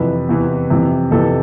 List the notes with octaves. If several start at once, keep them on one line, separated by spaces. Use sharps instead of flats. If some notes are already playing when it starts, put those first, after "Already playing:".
Already playing: F2 C3 E3 B4
E2 C3 E3
F2 C3 E3
F2 C3 E3 A4